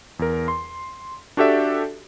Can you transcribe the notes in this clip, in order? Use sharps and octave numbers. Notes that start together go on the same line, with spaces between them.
E2 A#4
C6
D4 F#4 G4 A4 D5 E5